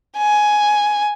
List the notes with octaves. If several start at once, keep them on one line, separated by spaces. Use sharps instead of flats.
G#5